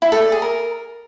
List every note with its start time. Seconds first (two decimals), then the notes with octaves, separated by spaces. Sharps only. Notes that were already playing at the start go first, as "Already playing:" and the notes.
0.02 E4
0.12 A4
0.22 D5
0.32 G#4
0.42 A#4